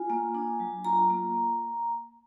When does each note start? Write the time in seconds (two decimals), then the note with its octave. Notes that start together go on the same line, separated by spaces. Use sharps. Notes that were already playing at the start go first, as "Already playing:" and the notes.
Already playing: F4 G#5
0.10 A#3
0.35 D4
0.60 F#3
0.84 F4 A#5
1.10 A#3